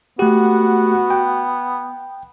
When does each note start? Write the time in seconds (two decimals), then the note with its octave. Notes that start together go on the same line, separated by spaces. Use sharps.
0.19 A3 B3 F#4 G4
1.10 G5